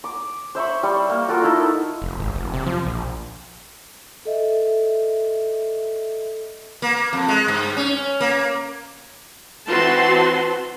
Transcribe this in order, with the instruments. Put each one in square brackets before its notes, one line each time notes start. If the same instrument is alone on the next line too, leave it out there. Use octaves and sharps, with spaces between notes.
[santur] D6
C5 E5 B5 C#6
G3 C6 C#6
A#3
F4 F#4 A4 A#4
A3 D#4 E4
[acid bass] F1
G#1
F1
C3
F3
A#1
[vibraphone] A4 D#5 E5
[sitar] A#3
F2
G#3
G2
C#4
A#3
[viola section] E3 C4 F#4 B4 A5 C6